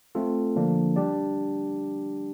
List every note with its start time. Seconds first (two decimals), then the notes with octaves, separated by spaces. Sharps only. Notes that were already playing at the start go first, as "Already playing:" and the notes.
0.15 A3 C4 F4 A4
0.56 D3 F3 A#3 D4
0.96 G3 D4 G4 D5